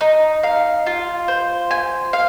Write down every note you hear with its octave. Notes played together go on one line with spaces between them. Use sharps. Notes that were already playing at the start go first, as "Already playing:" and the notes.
D#4
F5
F4
C5
G#5
F5